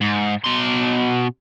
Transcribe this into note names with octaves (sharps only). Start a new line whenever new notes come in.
G#2
B2 C6